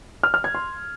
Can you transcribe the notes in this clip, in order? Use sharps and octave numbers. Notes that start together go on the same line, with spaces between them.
F6
F6
G#6
C6